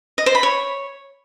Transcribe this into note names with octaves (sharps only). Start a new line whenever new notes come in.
D#5
C5
B5
C#5